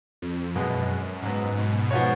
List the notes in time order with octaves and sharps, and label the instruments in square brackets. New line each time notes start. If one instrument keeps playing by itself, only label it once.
[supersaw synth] F2
[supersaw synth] F#2 [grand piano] B2 G#3 B3
[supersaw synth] G#2 [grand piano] C#3 F#3 B3
[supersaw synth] B2
[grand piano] F3 B3 F#4 C#5